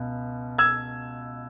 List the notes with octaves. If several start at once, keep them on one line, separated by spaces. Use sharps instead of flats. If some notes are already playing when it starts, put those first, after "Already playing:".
Already playing: C#2 B2
E6 G#6